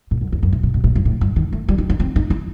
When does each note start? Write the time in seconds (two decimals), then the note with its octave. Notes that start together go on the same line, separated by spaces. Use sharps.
0.11 A2
0.21 F#2
0.32 E2
0.43 F#2
0.53 C3
0.63 C3
0.74 B2
0.84 A2
0.95 G2
1.05 A2
1.21 G2
1.36 D#3
1.53 A3
1.68 G3
1.78 D#4
1.90 D#4
2.00 C4
2.16 D#4
2.30 E4